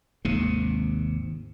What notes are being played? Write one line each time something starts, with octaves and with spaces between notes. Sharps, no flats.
G#1 D#2 C3